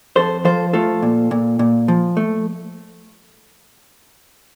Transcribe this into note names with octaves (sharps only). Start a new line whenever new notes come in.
F2 A4 C5
F3 A4 C5
A3 F4 A4
A#2
A#2
A#2
F3
A3